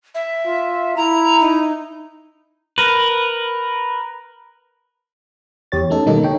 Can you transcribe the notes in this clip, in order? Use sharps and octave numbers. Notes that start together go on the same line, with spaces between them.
E5
F4
E4 A#5
D#4
A#4 B4
E2 G4 C#5 A6
A3 C#4 D#4 A4
B2 D#3 G3 A#3 D#4 A4
D3 D#4 C#5 G5